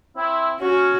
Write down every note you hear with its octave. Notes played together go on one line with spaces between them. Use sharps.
C4 E4
C#4 F#4